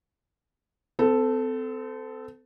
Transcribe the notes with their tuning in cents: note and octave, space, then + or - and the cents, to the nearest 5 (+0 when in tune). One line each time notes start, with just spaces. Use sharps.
C4 -35 A4 +0